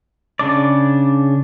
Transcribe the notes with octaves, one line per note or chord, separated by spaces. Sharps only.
C#3 D4 D5